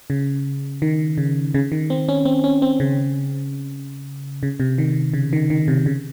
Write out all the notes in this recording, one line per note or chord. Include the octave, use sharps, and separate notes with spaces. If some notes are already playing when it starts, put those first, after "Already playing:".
C#3
D#3
C#3
C#3
D#3
C4
C#4
C4
C#4
C4
C#3
C#3
C3
D#3
C#3
D#3
D#3
C3
C#3